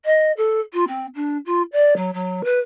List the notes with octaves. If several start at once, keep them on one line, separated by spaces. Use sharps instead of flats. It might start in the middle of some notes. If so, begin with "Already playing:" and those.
D#5
A4
F4
C4
D4
F4
D5
F#3
F#3
B4